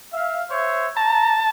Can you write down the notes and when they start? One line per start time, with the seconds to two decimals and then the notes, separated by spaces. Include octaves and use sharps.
0.13 E5 F5
0.50 C5 C#5 E5
0.97 A5 A#5